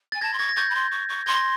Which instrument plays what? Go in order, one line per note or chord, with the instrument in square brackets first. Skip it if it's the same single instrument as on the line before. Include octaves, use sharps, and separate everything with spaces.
[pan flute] G#5 [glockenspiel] A6
[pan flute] A5 [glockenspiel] G#6 A#6
[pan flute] C6
[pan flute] C#6 [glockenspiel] G#6 A#6
[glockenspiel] A#6
[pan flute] C#6 [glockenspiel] G6 A6
[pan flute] B5
C6
C#6
C#6
[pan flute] C6 [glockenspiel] G#6 A#6
[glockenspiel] A#6